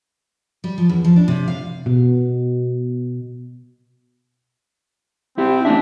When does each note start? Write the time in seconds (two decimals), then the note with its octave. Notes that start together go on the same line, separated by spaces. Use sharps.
0.64 G3
0.78 F3
0.89 E2
1.04 F3
1.16 D4
1.28 C3
1.48 F5
1.86 B2
5.38 C4 E4 G4
5.65 A3 C#4 D4 E5